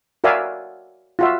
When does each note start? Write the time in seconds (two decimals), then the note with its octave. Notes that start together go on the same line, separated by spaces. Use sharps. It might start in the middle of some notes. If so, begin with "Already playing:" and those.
0.24 F#4 A#4 D5 E5 F5 G#5
1.19 F4 F#4 E5